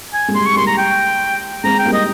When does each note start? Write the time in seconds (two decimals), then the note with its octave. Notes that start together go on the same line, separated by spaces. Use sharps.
0.13 G#5
0.28 G#3
0.35 G3 C6
0.46 C#6
0.56 G3 A#3 C6
0.67 A#5
0.78 G5
1.64 G#3 C4 A#5
1.79 G5
1.85 G3 A#3
1.93 D#5